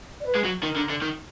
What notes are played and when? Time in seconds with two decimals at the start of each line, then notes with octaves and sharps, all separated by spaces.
0.20 D5
0.25 B4
0.35 G#3
0.44 F#3
0.63 D#3 A#4
0.76 D3
0.90 D3
1.02 D#3